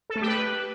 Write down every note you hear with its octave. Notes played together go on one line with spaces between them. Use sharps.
A4
A3
G4
B4